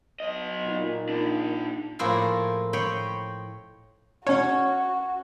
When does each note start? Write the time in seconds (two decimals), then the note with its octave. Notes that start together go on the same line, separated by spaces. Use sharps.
0.20 F#3 D#5
0.65 A#2 D#4
1.09 D4 G#4
1.99 A2 F3 A#3 E4 F4 G#4
2.73 C#5 D#5 G5 B5 C6
4.27 C#4 F#4 C#5